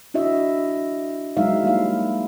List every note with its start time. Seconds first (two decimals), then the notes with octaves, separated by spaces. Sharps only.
0.14 D4 E4 F#4 D#5 E5
1.37 F#3 G#3 D#4 E5 F5
1.63 G3 A#3 E4 F5